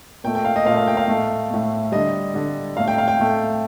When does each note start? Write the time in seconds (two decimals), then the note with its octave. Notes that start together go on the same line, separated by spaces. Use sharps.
0.24 A#2 G5
0.27 A3
0.35 G5
0.45 F5
0.56 D#5
0.65 A#2 F5
0.70 A3
0.77 F5
0.87 G5
0.97 F5
1.08 A2 A3
1.50 A2 A3
1.92 D3 G3 D#5
2.34 D3 G3
2.77 A2 A3 F5
2.88 G5
2.98 F5
3.08 G5
3.19 A2 A3